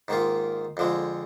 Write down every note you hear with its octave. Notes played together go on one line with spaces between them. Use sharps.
G#2 D#3 A#3 F4
F2 D3 F3 G#3